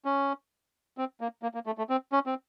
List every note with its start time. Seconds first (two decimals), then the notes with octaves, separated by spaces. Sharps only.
0.05 C#4
0.98 C4
1.21 A#3
1.43 A#3
1.54 A#3
1.66 A3
1.78 A3
1.90 C4
2.12 C#4
2.26 C4